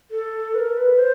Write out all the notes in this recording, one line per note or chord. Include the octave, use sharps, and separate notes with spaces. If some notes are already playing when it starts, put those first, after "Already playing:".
A4
B4
A#4
B4
C5